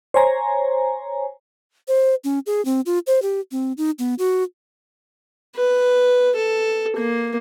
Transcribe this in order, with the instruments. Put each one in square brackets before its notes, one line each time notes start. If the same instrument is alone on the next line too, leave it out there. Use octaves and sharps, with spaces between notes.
[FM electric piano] C5 C#5 G#5 A#5
[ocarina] C5
C#4
G#4
C4
F4
C5
G4
C4
D#4
B3
F#4
[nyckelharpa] B4
A4
A#3